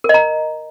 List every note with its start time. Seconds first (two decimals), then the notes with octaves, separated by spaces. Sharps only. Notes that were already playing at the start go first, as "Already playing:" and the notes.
0.04 A#4
0.09 D#5
0.14 A#5